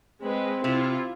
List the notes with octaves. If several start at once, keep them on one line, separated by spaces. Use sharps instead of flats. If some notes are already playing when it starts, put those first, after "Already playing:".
G#3 C4 B4
C3 E4 F4